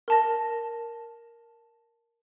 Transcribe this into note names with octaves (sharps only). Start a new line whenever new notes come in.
A#4 A5 A#6